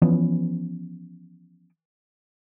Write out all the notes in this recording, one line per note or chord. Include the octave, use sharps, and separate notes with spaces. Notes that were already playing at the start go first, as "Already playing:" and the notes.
E3 F3 B3 C#4